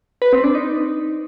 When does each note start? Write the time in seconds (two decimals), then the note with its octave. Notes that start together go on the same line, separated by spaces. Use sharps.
0.22 B4
0.33 C4
0.44 D4
0.55 D#4